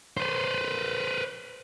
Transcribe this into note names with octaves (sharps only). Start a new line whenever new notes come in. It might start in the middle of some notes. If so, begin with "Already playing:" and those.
B4 C5